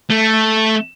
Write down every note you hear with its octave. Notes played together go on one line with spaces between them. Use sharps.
A3